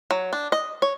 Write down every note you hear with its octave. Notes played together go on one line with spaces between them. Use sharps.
F#3
D4
D#5
C#5